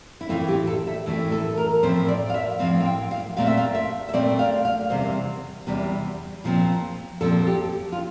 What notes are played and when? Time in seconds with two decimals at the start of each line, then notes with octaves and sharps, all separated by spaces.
0.21 E4
0.29 A2 E3 A3 C4 F4
0.48 G4
0.67 A4
0.87 E5
1.06 A2 E3 A3 C4
1.32 A4
1.57 A#4
1.83 A2 F3 A3 C4 C5
2.08 D5
2.30 F5
2.34 E5
2.59 A2 F3 A3 C4 F5
2.81 F5
2.85 G5
3.11 F5
3.37 A#2 A3 C4 F5
3.47 E5
3.57 F5
3.75 E5
4.09 E5
4.13 A#2 A3 C4 D5
4.39 F5
4.65 F5
4.90 E2 C3 G3 C4 C5
5.67 E2 C3 G3 C4
6.44 A#2 F3 C4
7.21 A#2 F3 C4 A4
7.47 G4
7.92 F4